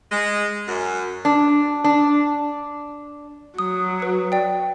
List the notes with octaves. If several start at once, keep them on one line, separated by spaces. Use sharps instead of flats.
G#3
F#2
D4
D4
F#3 D#6
B4 D#6
D5 G5